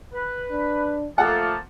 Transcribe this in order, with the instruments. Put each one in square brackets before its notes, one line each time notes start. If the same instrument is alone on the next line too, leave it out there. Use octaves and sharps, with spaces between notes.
[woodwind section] B4
[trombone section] D4
[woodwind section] F3 A#3 A5 [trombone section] A3 F4 [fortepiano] A4 F#5